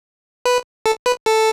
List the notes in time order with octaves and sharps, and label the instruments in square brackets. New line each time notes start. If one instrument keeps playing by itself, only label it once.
[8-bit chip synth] B4
A4
B4
A4